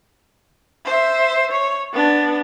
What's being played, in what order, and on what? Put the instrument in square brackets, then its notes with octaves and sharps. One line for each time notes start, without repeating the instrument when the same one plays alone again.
[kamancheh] C5 E5
C#5
B3 D4